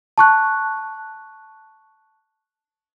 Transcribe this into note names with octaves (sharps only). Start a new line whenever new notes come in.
A5 C#6 F#6